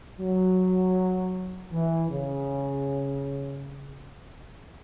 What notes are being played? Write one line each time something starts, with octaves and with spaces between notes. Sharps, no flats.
F#3
E3
C#3